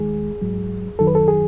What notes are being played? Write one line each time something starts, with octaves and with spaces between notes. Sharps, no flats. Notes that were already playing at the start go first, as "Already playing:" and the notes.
Already playing: D#2 D#3 G#3 G#4
G#2 F#3
F#2 D#3 F#3 A4
B4
A4
G#4